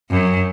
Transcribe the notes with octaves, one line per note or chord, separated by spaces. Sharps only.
F#2